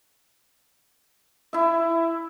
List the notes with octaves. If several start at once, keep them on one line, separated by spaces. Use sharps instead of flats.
E4 E5